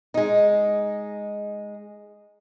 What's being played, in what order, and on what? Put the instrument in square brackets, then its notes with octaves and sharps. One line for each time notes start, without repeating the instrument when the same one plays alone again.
[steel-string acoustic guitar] G#3 D#4